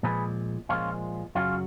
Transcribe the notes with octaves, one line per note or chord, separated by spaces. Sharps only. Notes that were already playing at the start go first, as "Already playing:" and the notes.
A#2 F3 G#3 G#4 B4
A#2 F3 G#3 C#4 F4
F#2 C#3 F#3 C#4 F4